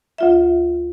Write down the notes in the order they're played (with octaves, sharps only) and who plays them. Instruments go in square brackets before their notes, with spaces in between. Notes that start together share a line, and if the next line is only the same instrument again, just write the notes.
[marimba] D2 F4 E5